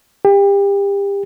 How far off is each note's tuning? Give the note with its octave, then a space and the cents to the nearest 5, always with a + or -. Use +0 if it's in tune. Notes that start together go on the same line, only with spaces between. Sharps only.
G4 +30